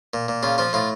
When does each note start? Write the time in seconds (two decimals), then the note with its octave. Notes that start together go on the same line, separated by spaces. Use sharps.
0.14 A#2
0.28 A#2
0.43 C#3 F4
0.58 F3 F4
0.73 A2 F4